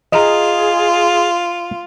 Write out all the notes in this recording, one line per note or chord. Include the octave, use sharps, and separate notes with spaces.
F4 G#4 D#5 F5 A#5